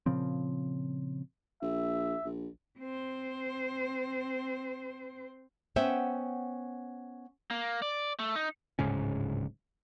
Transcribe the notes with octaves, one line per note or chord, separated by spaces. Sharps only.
A#2 C#3 F3 C4
A#1 E5
A#1
C4 C5
B3 C#4 C5 E5 F#5 G5
A#3
D5
A3
D#4
D1 G#2 C#3 C#4